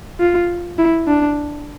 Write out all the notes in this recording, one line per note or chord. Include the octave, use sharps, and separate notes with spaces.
F4
E4
D4